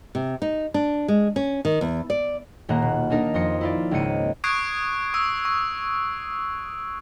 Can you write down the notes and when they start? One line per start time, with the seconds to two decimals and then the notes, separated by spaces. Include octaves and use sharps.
0.15 C3
0.42 D#4
0.74 D4
1.08 G#3
1.36 C#4
1.65 D#3
1.81 E2
2.10 D5
2.69 D#1 A#2 A#3 F#5 A#5
2.82 B2
3.10 A#3 D4 D#4 A#4
3.34 F2 C6 D#6 A#6 C#7
3.61 E4 F4 D5
3.91 C#2 G#2 A#3 C4 C#7 D#7
4.44 C#6 D#6 F#6 G#6 C7 D7
5.14 C#6 E6
5.45 C#6